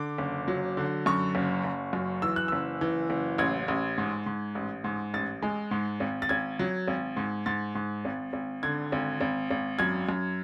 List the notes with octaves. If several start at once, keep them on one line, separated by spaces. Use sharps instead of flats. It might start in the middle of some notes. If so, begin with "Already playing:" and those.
Already playing: D3 D6
F#1
F#3
D3
F#2 C#6
F#1
F#1
F#2
E3 E6
F#6
F#1 E6
E3
F#1
A1 G#6
A1
G#2
G#2
A1
G#2
A1 A6
G#3
G#2
G#1
A6
G#1 G#6
F#3
G#1
G#2
G#2 A6
G#2
G#1
G#1
D3 G#6
G#1
G#1
G#1
F#2 G#6
F#2